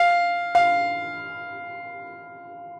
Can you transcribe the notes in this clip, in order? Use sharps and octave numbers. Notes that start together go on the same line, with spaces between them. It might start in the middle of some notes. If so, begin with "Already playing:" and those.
Already playing: F5
F5